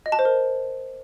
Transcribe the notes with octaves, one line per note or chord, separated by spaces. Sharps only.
D#5
A5
C5
A#4